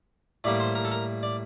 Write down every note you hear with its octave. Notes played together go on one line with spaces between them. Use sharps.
A2 G3 A#3 D5
C5
A#4
A4
A#4
D5